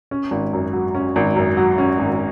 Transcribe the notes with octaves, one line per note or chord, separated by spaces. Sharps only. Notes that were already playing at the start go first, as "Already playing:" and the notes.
C#4
G#1
F#2
F#3
C#4
G#1
F#2
F#3
C#4
G#1